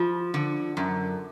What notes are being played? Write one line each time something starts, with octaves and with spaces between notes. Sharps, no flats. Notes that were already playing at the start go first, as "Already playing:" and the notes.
Already playing: F3 F4
D3
F#2